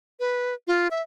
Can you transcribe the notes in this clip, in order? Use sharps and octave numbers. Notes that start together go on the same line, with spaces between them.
B4
F4
E5